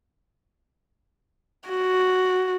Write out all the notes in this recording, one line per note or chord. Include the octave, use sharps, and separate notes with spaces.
F#4